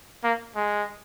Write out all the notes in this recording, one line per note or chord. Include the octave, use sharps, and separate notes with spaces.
A#3
G#3